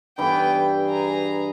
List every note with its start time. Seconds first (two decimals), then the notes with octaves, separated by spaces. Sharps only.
0.18 G2 E3 B3 E4 G5
0.86 G#4 A#5